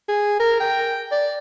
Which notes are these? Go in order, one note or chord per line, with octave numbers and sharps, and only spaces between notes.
G#4
A#4
G5
D5